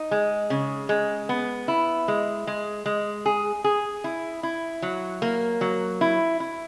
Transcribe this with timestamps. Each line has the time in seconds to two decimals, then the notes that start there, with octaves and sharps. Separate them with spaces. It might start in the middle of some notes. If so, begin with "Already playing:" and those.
Already playing: D#4
0.11 G#3
0.50 C#3
0.89 G#3
1.29 B3
1.68 E4
2.08 G#3
2.47 G#3
2.86 G#3
3.26 G#4
3.64 G#4
4.04 E4
4.43 E4
4.82 F#3
5.22 A#3
5.61 F#3
6.01 E4
6.40 E4